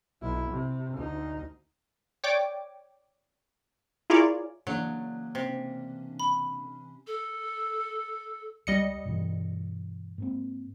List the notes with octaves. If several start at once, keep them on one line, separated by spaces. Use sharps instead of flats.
B1 E4
C3
D2 D#4
C#5 D5 G5 D6
E4 F4 G#4 A#4 C#5 D5
C#3 E3 F#3 A3 A#3 C#4 D4
C3
B5
A4
C#2 G3 D#5 C#7
G2 B2 E3
G#2 A#3 C4